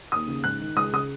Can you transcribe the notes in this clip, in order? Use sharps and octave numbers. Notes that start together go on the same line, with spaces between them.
D#2 D#6
C#3
G#2 F#6
D#3
C#2 D#6
C#3 D#6